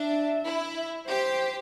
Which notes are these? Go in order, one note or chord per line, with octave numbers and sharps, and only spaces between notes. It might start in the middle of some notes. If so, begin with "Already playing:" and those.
Already playing: D4 E5
E4
G4 C5